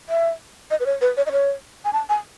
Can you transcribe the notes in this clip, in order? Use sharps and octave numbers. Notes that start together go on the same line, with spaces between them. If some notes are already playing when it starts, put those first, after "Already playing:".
E5
D#5
B4
C#5
B4
C#5
D#5
C#5
G#5
A5
G#5